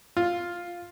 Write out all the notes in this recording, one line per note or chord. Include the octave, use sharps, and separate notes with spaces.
F4